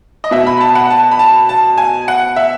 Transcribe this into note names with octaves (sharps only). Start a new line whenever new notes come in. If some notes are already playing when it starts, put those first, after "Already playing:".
D#5
B2 E5
B5
B5
A5
F#5
A5
B5
A5
A5
G#5
F#5
E5